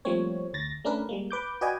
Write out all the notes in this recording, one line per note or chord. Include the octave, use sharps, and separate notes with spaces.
F3 G3 A3 A#3 C4 C#5
D2 A6 A#6
A3 C#4 D4 A#4 B4
G3 G#3 A#3
B4 D6 G6
F#4 B4 D5 D#5 G5 G#5